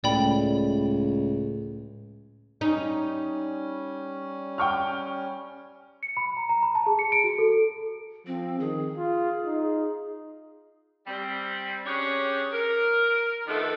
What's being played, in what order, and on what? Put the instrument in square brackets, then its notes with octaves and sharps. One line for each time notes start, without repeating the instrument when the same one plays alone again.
[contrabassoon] C#2 [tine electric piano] A2 A3 [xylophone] D5 G5 B5
[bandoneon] G3 C#4 [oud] D#4
[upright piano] G5 C#6 F6
[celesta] C#7
B5
A#5
A#5
B5
A5
G#4
C#7
D7
F#4
A4
[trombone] F3 [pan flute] C4
[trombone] D#3 [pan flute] G#4
[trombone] F4
D#4
[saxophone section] G3 C4
C#4 D4 G4 G#4 C#5
A#4
D#3 F3 A3 B3 D4 A4